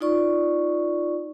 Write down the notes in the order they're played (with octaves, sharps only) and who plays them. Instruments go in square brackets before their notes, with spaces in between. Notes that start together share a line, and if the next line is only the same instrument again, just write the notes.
[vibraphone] D#4 F4 D5 C#6